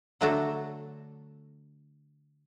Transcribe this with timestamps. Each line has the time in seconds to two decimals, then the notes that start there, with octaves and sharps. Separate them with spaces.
0.21 D3 F#3 A3 D4 F#4 A4